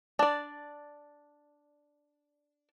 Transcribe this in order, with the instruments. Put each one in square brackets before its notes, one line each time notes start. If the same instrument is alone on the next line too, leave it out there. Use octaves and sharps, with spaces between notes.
[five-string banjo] D4 D5